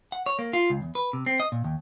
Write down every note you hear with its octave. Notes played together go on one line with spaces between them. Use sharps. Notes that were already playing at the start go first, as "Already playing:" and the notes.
F#5
C#5
A#3
F4
C#2
E2
B4
C3
C4
D#5
A#2
D#2